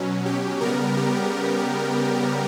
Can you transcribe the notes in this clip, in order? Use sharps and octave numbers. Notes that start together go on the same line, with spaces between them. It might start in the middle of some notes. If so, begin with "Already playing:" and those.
Already playing: B2 F#3 C#4
G4
C#3 G3 B3 A#4
G4